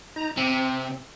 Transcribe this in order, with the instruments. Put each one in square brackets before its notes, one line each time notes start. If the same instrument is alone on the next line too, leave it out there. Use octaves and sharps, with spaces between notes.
[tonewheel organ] D#4 A#5
[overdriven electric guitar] C3 [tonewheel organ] C4